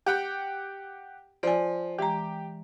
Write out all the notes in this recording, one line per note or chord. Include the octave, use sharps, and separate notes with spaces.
G4 F#5 G5
F3 D5 G#5
E3 G#3 G4 A#5